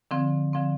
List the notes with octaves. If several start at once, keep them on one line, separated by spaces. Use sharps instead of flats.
D3 F3 C4
D3 F3 C4